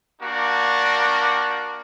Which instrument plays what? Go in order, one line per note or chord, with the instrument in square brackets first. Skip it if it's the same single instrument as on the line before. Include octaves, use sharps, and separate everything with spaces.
[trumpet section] A#3 D4 F#4 G4